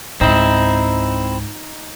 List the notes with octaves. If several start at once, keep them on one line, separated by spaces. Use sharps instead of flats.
C#2 G#2 C4 D#4 E4